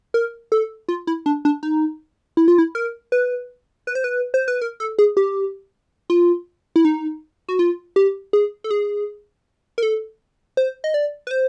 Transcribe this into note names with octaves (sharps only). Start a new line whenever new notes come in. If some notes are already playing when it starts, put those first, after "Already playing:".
A#4
A4
F4
E4
D4
D4
D#4
E4
F4
E4
A#4
B4
B4
C5
B4
C5
B4
A#4
A4
G#4
G4
F4
E4
D#4
F#4
F4
G4
G#4
A4
G#4
A#4
A4
C5
D#5
D5
B4
C5